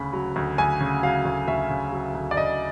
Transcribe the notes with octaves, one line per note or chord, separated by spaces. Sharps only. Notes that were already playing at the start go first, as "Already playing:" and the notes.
Already playing: D2 C#3 B5
F#3
D2
D2 G#5
C#3
F#3 F5
D2
D2 E5
C#3
F#3
D2
D5
D2 D#5